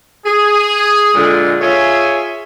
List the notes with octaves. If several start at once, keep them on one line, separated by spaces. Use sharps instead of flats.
G#4
A#2 D3 G#3
F4 G#4 C#5 E5 G#5